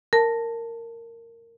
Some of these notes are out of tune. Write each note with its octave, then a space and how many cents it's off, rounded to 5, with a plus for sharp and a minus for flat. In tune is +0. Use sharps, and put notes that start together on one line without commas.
A#4 -15 A5 +10